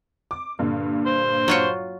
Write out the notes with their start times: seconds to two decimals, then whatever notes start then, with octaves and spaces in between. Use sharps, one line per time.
0.31 D6
0.59 G2 A#2 D3
1.06 C5
1.48 F#3 F4 C#5